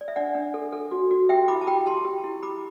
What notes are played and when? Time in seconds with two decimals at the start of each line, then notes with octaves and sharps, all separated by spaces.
0.01 D5
0.08 E5
0.16 D4 D5 F#5
0.35 D4
0.54 A4
0.73 A4
0.91 F#4
1.11 F#4
1.29 G4 E5 G5
1.48 E4 B5 D6
1.61 A5
1.67 G4 G5 B5
1.86 G4 A5 C6
2.05 G4
2.24 E4
2.43 G4 B5 D6